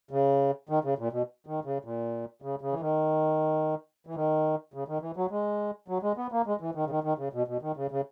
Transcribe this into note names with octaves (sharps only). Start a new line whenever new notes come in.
C#3
D#3
C#3
A#2
B2
D#3
C#3
A#2
C#3
C#3
E3
D#3
E3
D#3
C#3
D#3
E3
F#3
G#3
F#3
G#3
B3
A#3
G#3
E3
D#3
C#3
D#3
D#3
C#3
B2
B2
D#3
C#3
C#3